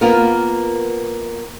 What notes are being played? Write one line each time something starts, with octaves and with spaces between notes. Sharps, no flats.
A#3 B3 F4 A#4